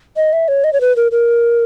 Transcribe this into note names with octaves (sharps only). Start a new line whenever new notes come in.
D#5
E5
C#5
D#5
C#5
B4
A#4
A#4